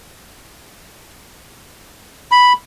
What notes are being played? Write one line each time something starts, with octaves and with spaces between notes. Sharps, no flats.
B5